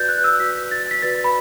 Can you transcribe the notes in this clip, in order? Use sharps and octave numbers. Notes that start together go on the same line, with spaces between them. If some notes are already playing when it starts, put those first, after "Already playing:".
Already playing: F#4 B4 D5 G6 A6
F#6
E6
F#4 B4 D5 B6
A6
B6
F#4 B4 D5 A6
B5